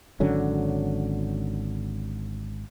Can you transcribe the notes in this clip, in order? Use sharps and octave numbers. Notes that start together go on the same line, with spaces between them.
G#1 D3 F#3 C#4